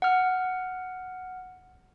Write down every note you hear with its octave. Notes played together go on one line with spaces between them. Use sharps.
F#5 F6